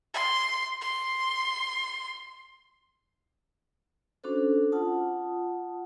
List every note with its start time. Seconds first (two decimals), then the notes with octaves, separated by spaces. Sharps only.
0.14 C6
0.81 C6
4.24 C#4 D4 F#4 A4 C5
4.72 F4 F#5 A5 D#6